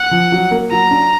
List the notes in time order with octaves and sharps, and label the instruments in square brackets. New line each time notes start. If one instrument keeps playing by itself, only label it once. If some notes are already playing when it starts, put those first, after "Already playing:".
Already playing: [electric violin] F#5
[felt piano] F3
F#3
A#3
[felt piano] F#3 [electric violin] A#5
[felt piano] D4